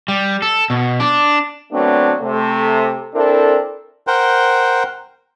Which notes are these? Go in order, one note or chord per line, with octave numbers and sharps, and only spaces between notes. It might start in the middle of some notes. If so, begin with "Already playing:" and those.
G3
A4
B2
D4
F#3 A3 B3 C4 D4
C3 A3
C4 D4 E4 A4 A#4
A#4 C5 F#5 G5